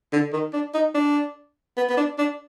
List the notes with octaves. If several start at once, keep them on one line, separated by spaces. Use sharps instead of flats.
D3
D#3
D4
D#4
D4
B3
B3
D4
D4